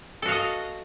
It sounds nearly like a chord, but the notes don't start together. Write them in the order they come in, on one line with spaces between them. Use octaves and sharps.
A4 F#4 F5 D#5